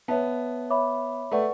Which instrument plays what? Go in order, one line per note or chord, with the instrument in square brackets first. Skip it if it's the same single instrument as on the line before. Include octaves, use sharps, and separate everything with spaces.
[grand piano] B3 [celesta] C#5 E5 A5
[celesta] C#5 E5 B5 D6
[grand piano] A3 [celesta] B4 D5 F#5 C#6